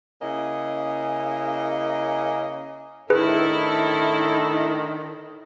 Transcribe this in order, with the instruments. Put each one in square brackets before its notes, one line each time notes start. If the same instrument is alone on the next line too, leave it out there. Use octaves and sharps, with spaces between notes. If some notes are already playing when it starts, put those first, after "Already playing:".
[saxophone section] C#3 A#3 C#4 E4 D#5
[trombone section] A2 A4 [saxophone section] D3 D#3 [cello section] E4 [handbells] G#4 B4